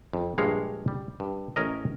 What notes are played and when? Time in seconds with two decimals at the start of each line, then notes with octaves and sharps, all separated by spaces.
0.13 F2
0.38 A#1 G2 G#3 C#5 F5
0.88 G3
1.20 G2
1.56 A1 C#4 A#4 D#5